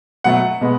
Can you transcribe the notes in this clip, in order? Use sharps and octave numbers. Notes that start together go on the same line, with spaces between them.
B2 F#3 A3 F#5
B2 G#3 B3